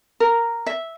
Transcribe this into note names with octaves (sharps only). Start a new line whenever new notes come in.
A#4
E5